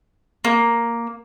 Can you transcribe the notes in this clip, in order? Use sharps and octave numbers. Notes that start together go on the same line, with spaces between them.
A#3